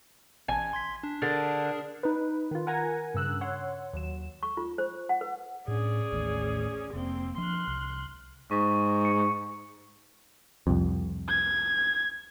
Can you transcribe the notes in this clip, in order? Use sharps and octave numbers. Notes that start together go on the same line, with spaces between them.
A1 G#5
C6 G#6 B6
D4
D3 D4 G#4 A#4
D#4 B4
D#3 F4
A#4 F#5 G#5 A#5 G#6 A#6
G2 C#3 E6 F#6
C#5 F#5 C6
D#2 F#3 E7
C#6
F4
C5
F#5
B4
A2 C#4 D4 G#4 D5
A1 D#2 A2
F1 A#3 C4
F3 D4 C6 F6 F#6
C2
G#2 C#6
C#7
C2 F2
G#6